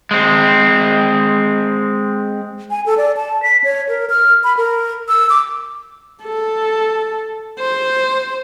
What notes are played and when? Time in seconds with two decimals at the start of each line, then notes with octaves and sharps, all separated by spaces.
0.11 G#3 C4
2.70 G#5
2.86 A4
2.97 D5
3.17 A5
3.42 B6
3.64 C#5
3.89 A#4
4.10 F6
4.44 B5
4.57 A#4
5.09 E6
5.30 D6
6.23 A4
7.59 C5